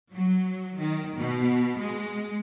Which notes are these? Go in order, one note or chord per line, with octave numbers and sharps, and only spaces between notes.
F#3
D#3
B2
G#3